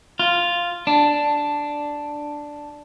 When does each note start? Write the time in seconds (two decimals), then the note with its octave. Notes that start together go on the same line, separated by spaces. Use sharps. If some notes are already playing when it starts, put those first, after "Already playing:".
0.19 F4
0.87 D4